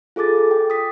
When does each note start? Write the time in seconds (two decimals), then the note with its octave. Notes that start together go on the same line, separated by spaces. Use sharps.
0.16 F4 G#4 A4 D6 A6
0.51 G5
0.70 D#6 B6